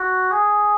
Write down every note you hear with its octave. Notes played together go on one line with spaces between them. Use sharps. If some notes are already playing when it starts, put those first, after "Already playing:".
Already playing: F#4
G#4